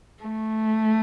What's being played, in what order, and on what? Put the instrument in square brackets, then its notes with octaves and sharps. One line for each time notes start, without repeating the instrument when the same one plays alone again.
[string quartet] A3